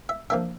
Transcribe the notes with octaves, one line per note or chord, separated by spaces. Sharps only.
E5
F3 A#3 D4 E5